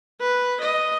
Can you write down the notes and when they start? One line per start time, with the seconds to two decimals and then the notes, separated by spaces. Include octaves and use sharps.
0.20 B4
0.60 D#5